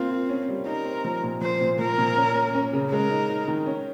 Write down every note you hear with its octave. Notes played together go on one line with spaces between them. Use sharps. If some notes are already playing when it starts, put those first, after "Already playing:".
Already playing: A#3 C4 F4
F4
C#4
G3
D#4 A#4
C4
F3
A#2
F3 C5
A#2
F3 A#4
A#2
C#4
C#4
C#4
C#3
G#3 A#4
D#4
D#4
D#3
C#4